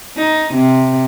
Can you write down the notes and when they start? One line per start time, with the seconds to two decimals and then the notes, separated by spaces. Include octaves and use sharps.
0.17 D#4
0.54 C3